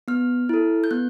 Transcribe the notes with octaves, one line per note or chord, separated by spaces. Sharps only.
B3 F6
E4 A4
G6
B3 F#6